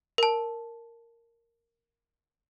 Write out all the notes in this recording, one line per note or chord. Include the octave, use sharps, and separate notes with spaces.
A#4 A5